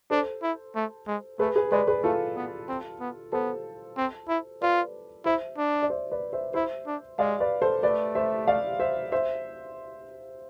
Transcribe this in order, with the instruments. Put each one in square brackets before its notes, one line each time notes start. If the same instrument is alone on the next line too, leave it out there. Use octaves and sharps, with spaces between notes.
[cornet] D4 [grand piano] A4 C5
[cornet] E4
A3
G#3
[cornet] A3 [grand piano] G#4 B4
[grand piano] G#4 B4
[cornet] G#3 [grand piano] B4 D5
[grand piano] G#4 B4
[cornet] A3 [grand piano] F4 A4
[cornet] B3
C4
B3
[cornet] B3 [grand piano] A4 C5
[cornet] C4
E4
[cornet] F4 [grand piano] B4 D5
[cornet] E4 [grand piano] C5 E5
[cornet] D4
[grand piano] D5
C5 E5
B4 D5
C5 E5
[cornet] E4 [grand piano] C5 E5
[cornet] D4
[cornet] G#3 [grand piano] D5 F5
[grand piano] B4 D5
A4 C5
[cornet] A3 [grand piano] B4 D5
[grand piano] C5 E5
D5 F5
C5 E5
C5 E5